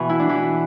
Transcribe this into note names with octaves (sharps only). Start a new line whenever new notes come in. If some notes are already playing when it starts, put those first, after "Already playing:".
Already playing: B2 E3 B3
E4
D4
E3 E4